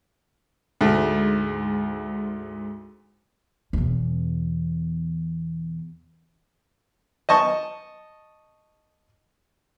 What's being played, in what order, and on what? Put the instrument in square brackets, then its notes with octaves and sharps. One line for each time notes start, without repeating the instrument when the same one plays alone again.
[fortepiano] D2 A3 [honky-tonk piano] G#2
[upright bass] E2 B2
[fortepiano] D#5 A5 C#6